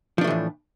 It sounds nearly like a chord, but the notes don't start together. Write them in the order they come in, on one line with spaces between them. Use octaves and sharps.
F3 D4 A3 E3 A2